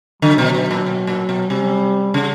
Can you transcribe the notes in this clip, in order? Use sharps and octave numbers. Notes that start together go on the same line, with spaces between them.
D3 F#3
B2
B2
A#2
B2
A#2
B2
C3 G3
C#3